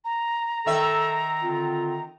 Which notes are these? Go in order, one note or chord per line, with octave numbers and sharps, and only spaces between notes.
A#5
D#3 A4 E5
D3 C4 F4